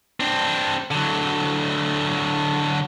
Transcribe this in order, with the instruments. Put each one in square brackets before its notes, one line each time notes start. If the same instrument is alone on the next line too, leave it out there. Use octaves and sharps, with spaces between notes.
[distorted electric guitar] C4 D4
D3 F#3